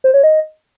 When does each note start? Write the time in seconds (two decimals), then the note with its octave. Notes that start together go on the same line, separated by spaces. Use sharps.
0.04 C5
0.14 C#5
0.23 D#5